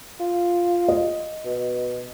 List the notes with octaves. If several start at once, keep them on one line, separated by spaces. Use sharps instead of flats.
F4
D#5
B2